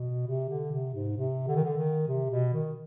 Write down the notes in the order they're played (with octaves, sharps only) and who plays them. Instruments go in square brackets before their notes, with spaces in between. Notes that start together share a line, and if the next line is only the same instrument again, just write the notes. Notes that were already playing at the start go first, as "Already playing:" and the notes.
Already playing: [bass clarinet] B2
C3
D3
C3
G#2
C3
D3
D#3
D3
D#3
C3
B2
D#3